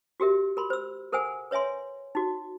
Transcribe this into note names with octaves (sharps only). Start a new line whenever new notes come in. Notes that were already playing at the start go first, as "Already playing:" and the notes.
F#4 G4 A#4 E5
A#4 B5 C6
C5 E6
A4 A#4 C5 F#5 G#5
B4 C#5 E5 G#5 C6
D#4 F#4